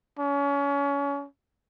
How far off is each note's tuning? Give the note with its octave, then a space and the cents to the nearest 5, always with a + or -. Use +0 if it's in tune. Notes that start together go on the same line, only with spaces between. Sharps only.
C#4 +30